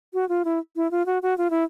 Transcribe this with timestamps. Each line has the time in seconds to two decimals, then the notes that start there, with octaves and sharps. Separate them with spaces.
0.14 F#4
0.29 F4
0.45 E4
0.76 E4
0.91 F4
1.06 F#4
1.23 F#4
1.38 F4
1.50 E4